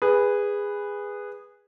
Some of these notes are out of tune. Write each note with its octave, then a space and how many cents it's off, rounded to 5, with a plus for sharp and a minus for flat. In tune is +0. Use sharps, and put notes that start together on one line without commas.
G#4 -15 B4 +0